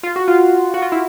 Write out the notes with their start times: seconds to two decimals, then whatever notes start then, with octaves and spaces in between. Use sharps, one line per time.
0.03 F4
0.16 F#4
0.28 F4
0.74 F#4
0.82 F4
0.92 E4